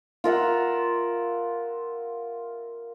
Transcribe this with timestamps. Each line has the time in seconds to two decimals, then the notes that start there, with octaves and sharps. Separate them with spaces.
0.24 F4 A#4 E5 F#5